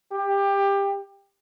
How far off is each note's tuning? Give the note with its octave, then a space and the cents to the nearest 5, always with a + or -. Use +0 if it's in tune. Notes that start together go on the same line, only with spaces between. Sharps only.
G4 +20